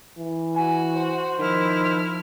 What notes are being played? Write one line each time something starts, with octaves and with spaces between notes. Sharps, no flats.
E3
F#4 G#5
C5
D#3 F3 E4 F6